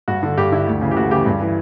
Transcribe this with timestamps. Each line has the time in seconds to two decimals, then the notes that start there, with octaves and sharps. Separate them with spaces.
0.08 G2 F#4
0.23 D3
0.38 G2 G4
0.52 D3 E4
0.67 D2
0.81 C#3 E3
0.91 G4
0.96 D2 F#4
1.11 C#3 E3 G4
1.26 G2
1.41 E3